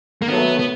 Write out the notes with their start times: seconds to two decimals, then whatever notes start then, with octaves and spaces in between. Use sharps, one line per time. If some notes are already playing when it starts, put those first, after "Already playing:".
0.22 A#3
0.26 D#3 F#3 A3 B3
0.59 B3